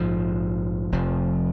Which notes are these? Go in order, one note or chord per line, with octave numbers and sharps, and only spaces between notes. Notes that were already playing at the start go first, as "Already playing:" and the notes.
Already playing: A#1 G#2 F3
F1 F2 F3